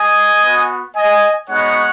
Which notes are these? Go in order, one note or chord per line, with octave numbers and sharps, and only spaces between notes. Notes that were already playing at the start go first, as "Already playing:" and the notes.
Already playing: D#5 G#5
B3 F#4
D#5 G#5
G#3 B3 D#4 F#4 C#5 F#5